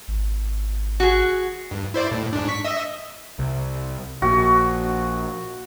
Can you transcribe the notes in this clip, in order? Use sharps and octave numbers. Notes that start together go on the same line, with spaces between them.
G#1
F#4 G#4
G2
E4 C5 D5
A2
G#2 D4
C#6 B6
D#5 E5
C2
A#1 A#2 F#4